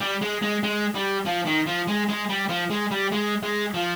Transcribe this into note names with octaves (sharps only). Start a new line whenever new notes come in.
G3
G#3
G#3
G#3
G3
F3
D#3
F3
G#3
G#3
G3
F3
G#3
G3
G#3
G#3
F3